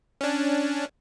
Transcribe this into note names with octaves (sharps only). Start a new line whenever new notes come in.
C#4 D4